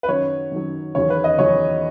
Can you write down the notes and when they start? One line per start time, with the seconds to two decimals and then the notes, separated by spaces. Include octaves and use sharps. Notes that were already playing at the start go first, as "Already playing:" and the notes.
0.03 B4
0.08 F#2 D#3 F#3 C#5
0.52 F#2 D#3 F#3
0.95 E2 D#3 F#3 C#5
1.10 B4
1.24 D#5
1.39 E2 D#3 F#3 C#5